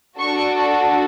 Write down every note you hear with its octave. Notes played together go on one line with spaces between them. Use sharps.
D4 F#4 A4 C#6